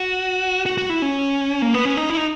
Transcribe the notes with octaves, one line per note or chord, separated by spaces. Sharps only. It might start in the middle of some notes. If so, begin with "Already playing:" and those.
Already playing: F#4
F#4
F#4
E4
C#4
A#3
B3
C#4
D#4
E4
D#4